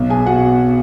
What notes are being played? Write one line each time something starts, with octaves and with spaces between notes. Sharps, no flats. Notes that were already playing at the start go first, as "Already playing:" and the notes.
Already playing: B1
G#4 G#5
B2 F#4 F#5